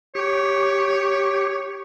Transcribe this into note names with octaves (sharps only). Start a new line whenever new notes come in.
G4 C#5